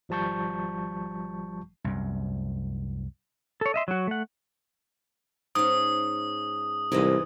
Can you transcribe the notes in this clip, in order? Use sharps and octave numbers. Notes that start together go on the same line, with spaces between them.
G#1 F3 G3 A5 C#6 G6
C2 F#2
A4 C#5
D#5 E5 C6
F#3 F#4
A3 F#5
G#2 C#4 D#6
C2 G#2 E3 D#5